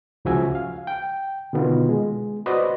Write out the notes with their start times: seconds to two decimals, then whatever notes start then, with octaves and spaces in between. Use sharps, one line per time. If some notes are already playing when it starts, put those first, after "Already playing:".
0.25 C#2 C#3 F3 F#4 E5 G#5
0.55 F5
0.87 G5
1.53 B2 D3 D#3 B3 F4
1.89 G#3
2.46 F#4 B4 C5 D5 D#5